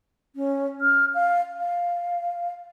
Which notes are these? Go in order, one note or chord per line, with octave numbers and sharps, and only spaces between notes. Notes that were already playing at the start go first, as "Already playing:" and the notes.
C#4
F6
F5
F5